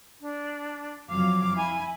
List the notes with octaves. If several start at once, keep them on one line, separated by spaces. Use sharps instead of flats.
D4
F2 F#3 F5 D6
E4 G#5